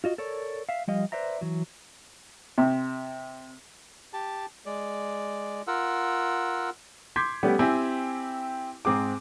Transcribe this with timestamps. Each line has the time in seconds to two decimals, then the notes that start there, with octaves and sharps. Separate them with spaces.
0.04 F4 F#4 D#5
0.18 A4 A#4 C#5 D5
0.69 E5 F5
0.88 F3 G3 D#5 F5
1.12 B4 C5 D5 E5 A#5
1.41 E3 F#3
2.58 C3
4.13 G4 A5
4.66 G#3 D5
5.67 F4 A#4 F#5 E6
7.16 C6 D6 G6 G#6 B6
7.43 G3 A3 B3 C#4 G4
7.59 C4 E4 G4 G5 G#5
8.85 G#2 C4 G#4 D6